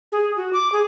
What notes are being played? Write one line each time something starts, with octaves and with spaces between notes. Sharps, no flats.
G#4
F#4
D6
G#4